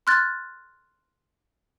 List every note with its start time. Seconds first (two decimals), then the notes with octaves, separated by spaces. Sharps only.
0.07 C6 F6 F#6 G#6 A6